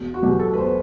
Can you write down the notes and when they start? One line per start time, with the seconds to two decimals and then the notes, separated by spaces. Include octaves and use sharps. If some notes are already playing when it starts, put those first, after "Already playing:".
Already playing: E1
0.14 F#4
0.23 E2 B2 F#3 G4
0.39 A4
0.54 B4
0.57 E1 C5